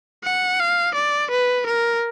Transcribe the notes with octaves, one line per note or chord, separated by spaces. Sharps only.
F#5
F5
D5
B4
A#4